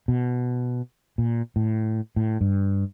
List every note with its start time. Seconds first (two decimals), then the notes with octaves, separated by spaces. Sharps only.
0.08 B2
1.18 A#2
1.56 A2
2.16 A2
2.41 G2